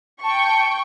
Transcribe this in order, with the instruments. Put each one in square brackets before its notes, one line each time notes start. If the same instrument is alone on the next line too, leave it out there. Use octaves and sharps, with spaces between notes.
[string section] G5 C#6 [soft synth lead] A5